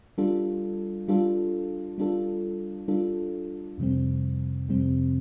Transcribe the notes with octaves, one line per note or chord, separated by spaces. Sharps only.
G3 D4 F4 A4
G3 D4 F4 A4
G3 D4 F4 A4
G3 D4 F4 A4
F2 C3 G3 C4
F2 C3 G3 C4